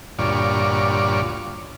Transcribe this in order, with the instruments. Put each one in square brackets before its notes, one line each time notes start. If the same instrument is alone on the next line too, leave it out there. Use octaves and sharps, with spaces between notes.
[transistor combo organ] D2 G2 A#2 F4 C#5 D5